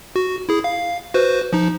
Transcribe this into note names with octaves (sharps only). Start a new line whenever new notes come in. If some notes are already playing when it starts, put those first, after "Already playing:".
F#4
E4 G#4
F5
F#4 B4 C5
F3 D#4